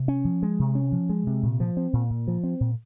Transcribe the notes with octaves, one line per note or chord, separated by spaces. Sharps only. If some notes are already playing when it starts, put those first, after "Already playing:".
Already playing: C3
C#4
F3
G#3
C3
C#4
F3
G#3
C3
A#2
F3
C4
A#2
A#2
F3
C4
A#2